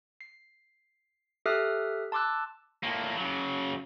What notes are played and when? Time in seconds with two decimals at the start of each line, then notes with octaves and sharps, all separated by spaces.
0.21 C7
1.46 G4 A4 E5 D#6 F6 F#6
2.12 A5 C6 D6 E6 F#6
2.83 A2 A#3
3.17 C#3 F#3